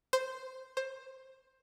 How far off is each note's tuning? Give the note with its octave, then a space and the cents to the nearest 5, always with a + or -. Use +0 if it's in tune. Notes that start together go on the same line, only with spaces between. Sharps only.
C5 -5
C5 +15